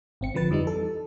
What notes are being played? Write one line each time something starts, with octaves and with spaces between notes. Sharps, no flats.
G#1 C4 C#7
D3 F3 B4 A6
F2 E3 G3 D#4
A4